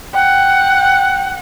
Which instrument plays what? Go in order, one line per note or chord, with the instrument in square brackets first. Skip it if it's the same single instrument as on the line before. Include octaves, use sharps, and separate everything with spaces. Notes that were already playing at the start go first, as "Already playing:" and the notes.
[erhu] F#5 [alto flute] G5